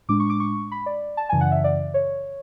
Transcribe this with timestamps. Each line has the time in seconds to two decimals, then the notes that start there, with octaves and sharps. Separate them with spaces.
0.09 A2 G#3 D4 D6
0.20 C#6
0.30 D6
0.40 C#6
0.72 B5
0.86 D5
1.17 A5
1.29 F#2 C#3 E3 G#5
1.41 F#5
1.52 E5
1.64 D5
1.94 C#5